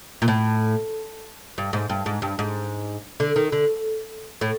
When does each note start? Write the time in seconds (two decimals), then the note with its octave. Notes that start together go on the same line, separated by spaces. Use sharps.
0.22 A#2
0.28 A2
1.58 G2
1.73 G#2
1.90 G2
2.06 G#2
2.22 G2
2.39 G#2
3.20 D3
3.36 D#3
3.52 D3
4.41 A2